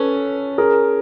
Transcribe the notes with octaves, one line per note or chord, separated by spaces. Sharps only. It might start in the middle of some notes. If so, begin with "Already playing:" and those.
Already playing: C#4 A4 B4
G#4 A#4